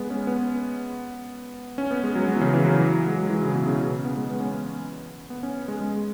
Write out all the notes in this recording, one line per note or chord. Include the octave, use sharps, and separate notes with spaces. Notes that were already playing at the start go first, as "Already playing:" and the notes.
Already playing: G#3 B3
C#4
B3
C#4
B3
G#3
F#3
B3
E3
C#3
E3
F#3
G#3
F#3
E3
C#3
B2
C#3
C#3
B3
G#3
B3
C#4
B3
B3
C#4
G#3
G#3